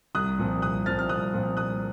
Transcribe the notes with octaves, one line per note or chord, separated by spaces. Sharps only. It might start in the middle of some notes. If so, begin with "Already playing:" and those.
C2 D#6 F#6
A#2 F3 C4
C2 D#6 F#6
A#2 F3 C4 F6 A6
F6
C2 D#6 F#6
A#2 F3 C4
C2 D#6 F#6